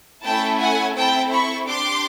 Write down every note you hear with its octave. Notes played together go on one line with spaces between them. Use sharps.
A3 C#4 E4 A4 G5 A5
F#5 G#5
C4 E4 A4 G5 A5
B5 C#6
D4 G4 C6 D6